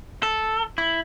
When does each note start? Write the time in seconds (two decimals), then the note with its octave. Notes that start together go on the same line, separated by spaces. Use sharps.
0.23 A4
0.78 E4